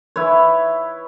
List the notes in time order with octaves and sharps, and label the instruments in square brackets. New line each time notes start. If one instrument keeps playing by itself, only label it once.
[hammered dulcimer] E4 B4 C#5